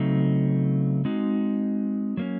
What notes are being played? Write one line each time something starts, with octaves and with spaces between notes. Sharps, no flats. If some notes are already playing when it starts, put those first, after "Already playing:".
Already playing: C#3 F#3 A3 C4 D#4
G#3 C4 D#4 F#4
F#3 A#3 C#4